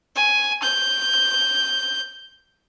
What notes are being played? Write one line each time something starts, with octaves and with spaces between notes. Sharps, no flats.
G#5
G6